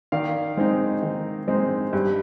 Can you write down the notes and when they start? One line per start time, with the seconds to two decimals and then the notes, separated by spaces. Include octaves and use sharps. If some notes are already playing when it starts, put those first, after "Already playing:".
0.12 D#3 D5 F5
0.57 G#3 C4 D#4
1.03 D#3
1.48 G#3 C4 D#4
1.93 G2